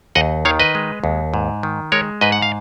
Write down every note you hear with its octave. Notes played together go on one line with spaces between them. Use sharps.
D#2 D#5 F#5
D#3 C#5 F5
B4 D#5
G#3
D#2
G#2
D#3
G#3 A#4 C#5
G#2 B4 D#5
F#5
F5